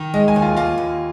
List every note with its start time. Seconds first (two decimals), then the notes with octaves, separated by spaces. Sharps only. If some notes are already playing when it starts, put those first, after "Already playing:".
Already playing: D#3
0.14 G#3 D#5
0.28 G#5
0.36 D#2
0.42 F4
0.57 A#3 F4
0.78 D#2